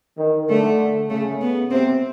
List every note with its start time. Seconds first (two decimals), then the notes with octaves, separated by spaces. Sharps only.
0.18 D#3
0.49 D3 A3
1.10 C#3 A3
1.41 B3
1.71 C3 C4